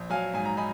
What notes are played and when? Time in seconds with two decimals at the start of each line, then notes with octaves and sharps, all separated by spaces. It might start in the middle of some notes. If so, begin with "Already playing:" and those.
Already playing: A#1
0.10 F#3 F5 G#5
0.33 G#2 G#5
0.46 A#5
0.57 D#4 G#5 B5